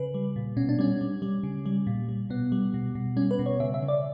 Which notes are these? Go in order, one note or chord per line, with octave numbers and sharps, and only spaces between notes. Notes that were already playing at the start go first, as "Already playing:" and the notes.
Already playing: C#3 B4
G3
A#2
B2 C#4
D4
G3 C#4
G3
G3
C#3
G3
A#2
G3
B2 B3
G3
B2
B2
G3 C#4
B4
B2
C#5
C#3 E5
E5
C#3
D5